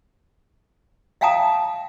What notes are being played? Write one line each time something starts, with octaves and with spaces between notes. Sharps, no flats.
E5 F5 G5 A5 A#5 D#6